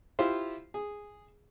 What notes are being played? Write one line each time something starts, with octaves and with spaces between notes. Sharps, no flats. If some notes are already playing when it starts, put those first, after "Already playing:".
E4 F4 G4 C5 F5
G#4